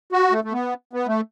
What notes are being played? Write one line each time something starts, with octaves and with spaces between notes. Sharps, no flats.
F#4
A3
A3
B3
B3
A3